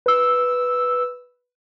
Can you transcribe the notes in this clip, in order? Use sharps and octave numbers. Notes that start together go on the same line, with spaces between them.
B4 E6